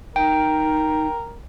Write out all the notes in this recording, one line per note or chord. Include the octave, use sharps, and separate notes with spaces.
D#4 A#4 G5